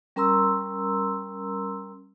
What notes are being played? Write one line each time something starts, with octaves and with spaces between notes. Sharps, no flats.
G3 C#4 A#4 A#5 C6 E6